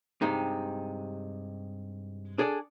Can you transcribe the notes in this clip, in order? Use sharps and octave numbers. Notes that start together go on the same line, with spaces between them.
G2 C3 G#3 D#4
D4 G#4 A4 D5